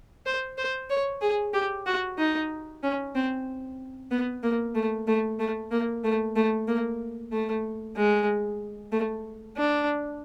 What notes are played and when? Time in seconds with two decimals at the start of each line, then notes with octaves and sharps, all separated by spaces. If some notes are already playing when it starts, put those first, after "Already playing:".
0.26 C5
0.58 C5
0.90 C#5
1.22 G#4
1.54 G4
1.87 F#4
2.18 D#4
2.83 C#4
3.15 C4
4.11 B3
4.43 A#3
4.75 A3
5.07 A3
5.39 A3
5.72 A#3
6.04 A3
6.36 A3
6.68 A#3
7.32 A3
7.96 G#3
8.92 A3
9.57 D4